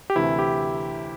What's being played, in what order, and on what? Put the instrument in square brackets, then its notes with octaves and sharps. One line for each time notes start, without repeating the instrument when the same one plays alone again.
[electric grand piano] G4
D2 C3 E3 E4
G4